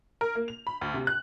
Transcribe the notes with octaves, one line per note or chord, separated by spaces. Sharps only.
A#4
A#3
F7
B5
D2
C3
F#6